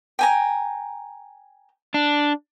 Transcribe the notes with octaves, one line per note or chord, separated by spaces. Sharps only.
G5 G#5 A#5
D4